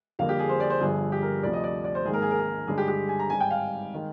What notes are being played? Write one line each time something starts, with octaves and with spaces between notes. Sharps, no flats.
F2 D3 G3 A#3 F5
G4
G#4
C5
D5
C5
G1 G2 D3 F3 G#4
G4
A#4
D2 C3 F3 D5
D#5
D5
D5
C5
G#1 G#2 D#3 A#3 G#4
A#4
G#4
A#4
G#4
G2 D3 G#3 G#4
G4
G4
G#5
A#5
G#1 G#2 G3 G#5
G5
F5
D#3 G#3